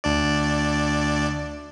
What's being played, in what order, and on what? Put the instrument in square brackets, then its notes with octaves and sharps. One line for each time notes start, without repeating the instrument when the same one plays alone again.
[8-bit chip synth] D2 D4 D5